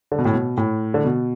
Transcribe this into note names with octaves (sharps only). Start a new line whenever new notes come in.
D3
B2
A2
B2
A2
D3
B2